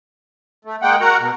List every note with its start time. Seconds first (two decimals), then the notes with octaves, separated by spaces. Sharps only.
0.65 A3
0.82 G#3 A#3 F#5 G5
1.01 F#4 A#4 F#5 A#5
1.20 B2